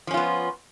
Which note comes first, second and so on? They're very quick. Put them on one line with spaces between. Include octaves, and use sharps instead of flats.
F3 C#4 F4 B3